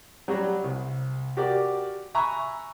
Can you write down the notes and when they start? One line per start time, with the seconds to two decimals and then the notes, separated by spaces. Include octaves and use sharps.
0.28 F#3 G3 F#4
0.64 C2
1.37 F#4 G4 A#4 D5
2.15 E5 G#5 A#5 B5 C#6 F#6